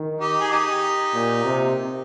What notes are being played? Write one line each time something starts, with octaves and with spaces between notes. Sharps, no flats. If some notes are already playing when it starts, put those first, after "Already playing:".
Already playing: D#3
D#4 G4
G#4
D#4 G4
A#2
C3